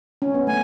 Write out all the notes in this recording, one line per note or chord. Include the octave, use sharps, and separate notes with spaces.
C#4
B3
A3 G#5